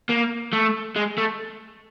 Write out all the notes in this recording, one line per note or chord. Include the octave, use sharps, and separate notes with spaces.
A#3
A3
G#3
A3